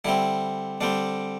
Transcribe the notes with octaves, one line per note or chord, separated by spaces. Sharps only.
D3 G3 C4 E4
D3 G3 C4 D4